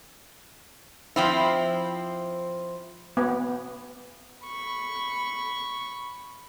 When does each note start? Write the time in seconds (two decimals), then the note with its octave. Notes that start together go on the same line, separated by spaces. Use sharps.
1.16 F3 C4 E4
3.17 B3
4.46 B5 C#6